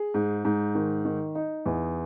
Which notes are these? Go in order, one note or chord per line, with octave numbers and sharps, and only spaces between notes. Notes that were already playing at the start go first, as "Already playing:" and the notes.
Already playing: G#4
G#2
G#2
D#3
D#3
D#4
E2